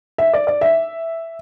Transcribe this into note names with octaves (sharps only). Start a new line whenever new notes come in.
E5
D5
D5
E5